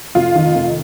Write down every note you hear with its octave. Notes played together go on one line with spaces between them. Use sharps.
F1 F4
D#3
F1